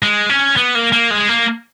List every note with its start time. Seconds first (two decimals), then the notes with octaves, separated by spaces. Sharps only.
0.03 G#3
0.29 C#4
0.56 B3
0.75 A#3
0.92 A#3
1.10 G#3
1.29 A#3